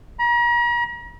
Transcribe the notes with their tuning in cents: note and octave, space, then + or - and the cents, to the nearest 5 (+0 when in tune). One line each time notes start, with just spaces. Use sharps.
A#5 +40